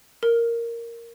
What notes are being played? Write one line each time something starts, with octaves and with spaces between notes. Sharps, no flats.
A#4